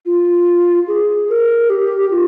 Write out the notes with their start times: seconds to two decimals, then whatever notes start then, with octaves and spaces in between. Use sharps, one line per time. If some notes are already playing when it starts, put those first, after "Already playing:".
0.06 F4
0.88 G#4
1.29 A#4
1.70 G4
2.11 F4